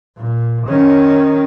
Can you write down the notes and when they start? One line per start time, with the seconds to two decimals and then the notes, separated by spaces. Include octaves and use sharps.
0.17 A#2
0.67 D#3 C#4